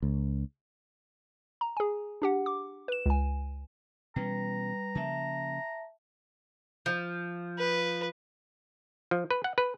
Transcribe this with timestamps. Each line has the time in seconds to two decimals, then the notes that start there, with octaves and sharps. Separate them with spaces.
0.02 C#2
1.61 A#5
1.77 G#4 G#5
2.22 D4 G4 F#5
2.46 D6
2.88 B4 E7
3.06 C#2 G#5
4.16 B2 E3 G3 C#4 B4 A#5
4.95 C#3 F3 A#3 E5 A5
6.86 F3
7.58 B4
9.11 F3
9.31 B4
9.44 F#5
9.58 B4